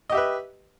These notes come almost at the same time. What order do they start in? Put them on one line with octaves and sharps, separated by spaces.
D#5 G4 E5 B4